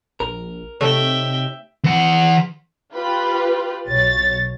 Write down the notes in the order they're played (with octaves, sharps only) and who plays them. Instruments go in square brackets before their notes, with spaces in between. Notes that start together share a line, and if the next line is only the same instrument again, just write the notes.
[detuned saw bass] A#1 [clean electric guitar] A#4
[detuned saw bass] C3 [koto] A3 [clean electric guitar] D#4 G4 C#5 [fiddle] E5 G5
[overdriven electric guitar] E3 F#5
[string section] F4 G4 B4
B1 C#5 A6